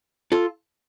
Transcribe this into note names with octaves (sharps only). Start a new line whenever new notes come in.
F4 A4